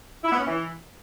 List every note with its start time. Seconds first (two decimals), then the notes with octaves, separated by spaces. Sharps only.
0.24 E4
0.32 B3
0.39 C#4
0.46 E3